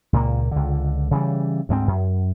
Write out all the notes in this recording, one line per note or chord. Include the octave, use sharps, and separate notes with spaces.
C#2 A#2 G#3 A#3
C#2 D3
C#3 E3 G3
D2 G#2 F#3 C4
F#2